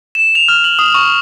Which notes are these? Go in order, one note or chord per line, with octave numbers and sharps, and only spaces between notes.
E7
F7
F6
F#7
D#6
C#6